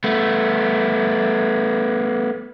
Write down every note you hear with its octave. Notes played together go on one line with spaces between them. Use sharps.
A3 B3